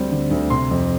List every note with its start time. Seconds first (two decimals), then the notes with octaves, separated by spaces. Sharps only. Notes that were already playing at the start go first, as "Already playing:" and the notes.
Already playing: D2 D3 G3 C4
0.11 D3
0.31 D2
0.50 C3 C6
0.71 F2